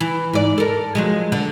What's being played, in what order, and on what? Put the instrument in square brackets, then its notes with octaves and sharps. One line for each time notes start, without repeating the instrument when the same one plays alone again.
[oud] E3
G#2 D5
A4 A#4
F3 F#3 G#3
D3